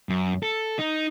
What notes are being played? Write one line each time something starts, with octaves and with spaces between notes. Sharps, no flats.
F#2
A4
D#4